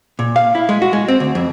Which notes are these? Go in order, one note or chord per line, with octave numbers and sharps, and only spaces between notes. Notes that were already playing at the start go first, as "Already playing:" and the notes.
A#2
F5
E4
G#3
F#4
G#3
C4
D2
F2